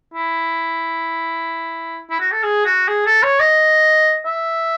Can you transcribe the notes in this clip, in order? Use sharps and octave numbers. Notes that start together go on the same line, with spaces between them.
E4
E4
F#4
A4
G#4
F#4
G#4
A4
C#5
D#5
E5